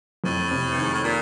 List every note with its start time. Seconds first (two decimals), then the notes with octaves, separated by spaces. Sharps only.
0.24 F2 A2
0.51 C3
0.72 G2
0.77 D#3
0.82 G#2
0.93 A2
1.04 A#2